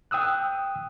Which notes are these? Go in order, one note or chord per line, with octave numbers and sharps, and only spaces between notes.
G5 D#6 E6 F#6